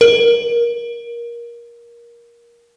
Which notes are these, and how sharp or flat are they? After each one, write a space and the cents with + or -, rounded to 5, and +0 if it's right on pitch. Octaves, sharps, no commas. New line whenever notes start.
A#4 +20